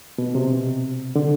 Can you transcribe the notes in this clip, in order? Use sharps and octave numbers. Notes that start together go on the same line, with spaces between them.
B2
C3
D3